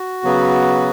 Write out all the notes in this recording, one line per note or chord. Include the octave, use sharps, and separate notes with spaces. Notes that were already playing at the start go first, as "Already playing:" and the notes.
Already playing: F#4
C#3 F#3 B3